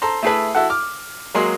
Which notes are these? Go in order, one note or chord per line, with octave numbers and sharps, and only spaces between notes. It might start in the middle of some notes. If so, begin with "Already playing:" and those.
A4 C5 A#5 C6
A3 E4 G#4 A4 B4
E4 F#4 A4 F#5
D6 F6
F#3 G#3 A#3 G#4 D#5 C6